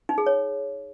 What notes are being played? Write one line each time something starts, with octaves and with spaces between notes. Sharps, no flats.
D#4
G#4
C#5